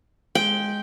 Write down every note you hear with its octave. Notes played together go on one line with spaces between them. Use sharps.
G#3 G5